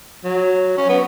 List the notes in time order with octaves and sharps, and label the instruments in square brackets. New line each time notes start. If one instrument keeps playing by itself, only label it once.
[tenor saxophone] F#3
C#4
B3